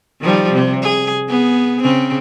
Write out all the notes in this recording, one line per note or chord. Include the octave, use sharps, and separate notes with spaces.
D#3 F3 G3
C3
G#4
B3 G#4
C#3 C4